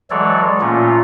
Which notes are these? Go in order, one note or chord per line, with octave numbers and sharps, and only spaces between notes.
E3 F#3 G#3 A4 C#5 D5
A#2 A3 A#3 C#4 F4